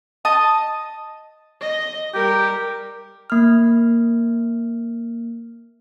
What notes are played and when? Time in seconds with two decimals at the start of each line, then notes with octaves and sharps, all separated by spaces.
0.25 D#5 A5 D#6
1.61 D#5
2.14 G3 G4 A#4
3.30 A#3 F6